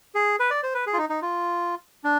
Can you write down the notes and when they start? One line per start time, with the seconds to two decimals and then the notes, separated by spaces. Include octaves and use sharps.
0.15 G#4
0.40 B4
0.50 D5
0.63 C5
0.74 B4
0.86 G#4
0.93 F4
0.98 D#4
1.09 D#4
1.22 F4
2.04 D4